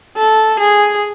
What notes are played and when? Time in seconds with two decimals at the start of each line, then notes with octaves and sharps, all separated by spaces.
0.17 A4
0.60 G#4